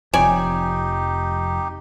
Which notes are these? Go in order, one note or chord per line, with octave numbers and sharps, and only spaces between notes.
F1 F2 D#4 G4 C#5 D5 G#5